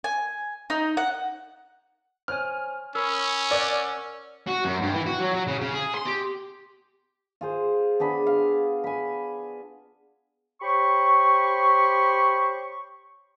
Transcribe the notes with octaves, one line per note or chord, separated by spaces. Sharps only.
G#5
D#4
F#5
C5 C#5 G#5 F6
C#4 A#4 B5 D#6 E6
A#4 D5 F#5 F#6
F#4
F#2
G2
E3
F#4
F#3
F#3
C#3
C#3
G#4
C6
G4
F4 G#4 C5
B3 D4 G#4 B5
F5
G#5 B5
G4 C5 C#5 B5 C#6